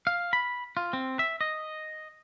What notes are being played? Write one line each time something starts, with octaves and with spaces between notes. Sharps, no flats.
F5
B5
F4
C4
E5
D#5